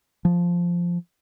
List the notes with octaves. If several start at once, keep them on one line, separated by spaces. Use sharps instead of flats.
F3